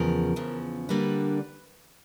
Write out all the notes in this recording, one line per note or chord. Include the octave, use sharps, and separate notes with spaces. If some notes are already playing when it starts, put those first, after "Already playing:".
Already playing: E2 C#3 F3 A#4
E2 C#3 F3
D3 G3 A#3 D4 B4